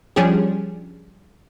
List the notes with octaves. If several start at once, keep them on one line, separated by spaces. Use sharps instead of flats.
F3 G3 C#4 D4 G4 G#4